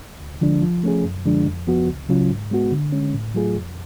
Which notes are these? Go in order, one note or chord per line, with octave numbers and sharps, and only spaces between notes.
D2
D3 F3 G#3 D4
F3
A3 C#4 G#4
F#2
D3 F3 G#3 D4
F2
F3 B3 F#4
C#2
C#3 F#3 C#4 F4
G#2
G#3 B3 F#4
D3
G#3 C#4
A2
F#3 A3 F4 G#4
F2